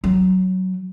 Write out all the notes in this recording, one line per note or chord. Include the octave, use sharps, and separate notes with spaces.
F#3